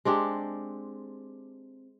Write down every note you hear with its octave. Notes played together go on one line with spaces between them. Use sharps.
G#3 C4 D4 G4